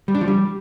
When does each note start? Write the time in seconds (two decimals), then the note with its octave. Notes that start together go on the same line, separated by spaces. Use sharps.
0.08 G3
0.15 D4
0.21 F3
0.28 G3